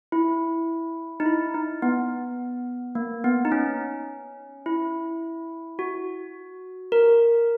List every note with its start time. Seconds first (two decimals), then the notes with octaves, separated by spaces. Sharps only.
0.12 E4
1.20 D#4
1.26 E4
1.54 D#4
1.82 B3
2.95 A#3
3.24 B3
3.45 D#4
3.52 C#4
4.66 E4
5.79 F#4
6.92 A#4